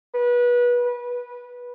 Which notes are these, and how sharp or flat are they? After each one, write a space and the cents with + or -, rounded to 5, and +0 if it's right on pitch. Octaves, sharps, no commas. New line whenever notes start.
B4 -25
B4 -15